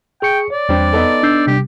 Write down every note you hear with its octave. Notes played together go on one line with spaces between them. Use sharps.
G#4 G5 C#6 C#7
C#5 D5
E2 G3 C4 D4
B3 D#4 A4
D4 E6 G6 C7
C3 G3 G4